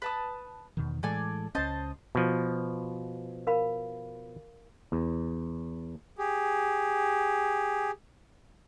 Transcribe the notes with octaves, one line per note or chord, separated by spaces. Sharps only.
B4 A5 D#6
E2 B2 D#3
A2 E3 G#3 A4 D5 G#5
C#2 C#4 C5 D#5 A5
B2 F3
A#4 F5 B5
E2
G4 G#4